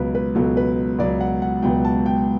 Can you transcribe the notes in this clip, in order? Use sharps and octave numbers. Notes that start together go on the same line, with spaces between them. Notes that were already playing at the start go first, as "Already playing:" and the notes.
Already playing: C#2 B2 F#3 B4
B4
C#2 B2 F#3 A4
B4
C#2 B2 F#3 D5
F#5
F#5
C#2 B2 F#3 G5
A5
G5